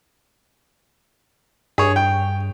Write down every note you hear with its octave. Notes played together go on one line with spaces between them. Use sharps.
G2 G#4 C#5
G5